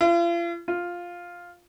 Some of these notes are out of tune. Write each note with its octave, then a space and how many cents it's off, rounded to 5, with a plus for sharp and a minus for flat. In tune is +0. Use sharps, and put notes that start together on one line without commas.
F4 -40
F4 +5